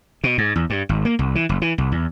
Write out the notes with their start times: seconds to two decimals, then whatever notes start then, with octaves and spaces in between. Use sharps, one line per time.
0.24 B2
0.38 G#2
0.56 E2
0.70 G2
0.89 G#1
1.05 A#3
1.19 C2
1.35 E3
1.49 F#1
1.62 E3
1.78 C2
1.92 E2